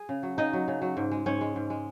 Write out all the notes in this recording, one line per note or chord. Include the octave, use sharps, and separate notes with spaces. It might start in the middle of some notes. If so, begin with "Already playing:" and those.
Already playing: G#4
C#3
F#3
C#3 D#4 D#5
F#3
C#3
F#3
G#2
G#3
G#2 C#4 C#5
G#3
G#2
G#3